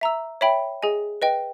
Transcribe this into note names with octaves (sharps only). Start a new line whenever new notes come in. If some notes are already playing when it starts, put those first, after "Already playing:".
E5 A#5 E6
C#5 E5 G5 B5
G#4 D#5 G#5
B4 D#5 G5